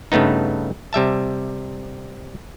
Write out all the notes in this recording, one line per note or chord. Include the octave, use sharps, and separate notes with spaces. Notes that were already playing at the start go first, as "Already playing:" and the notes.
G2 C#3 A3 B3 D#4
C3 G3 E5 A5